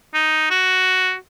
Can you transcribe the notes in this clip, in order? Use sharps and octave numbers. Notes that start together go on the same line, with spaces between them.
D#4
F#4